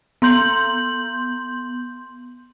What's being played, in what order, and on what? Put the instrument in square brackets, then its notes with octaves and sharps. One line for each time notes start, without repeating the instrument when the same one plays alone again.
[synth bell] B3 C6 G6 F#7